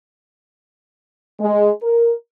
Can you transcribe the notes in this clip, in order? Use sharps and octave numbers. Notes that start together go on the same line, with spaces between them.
G#3
A#4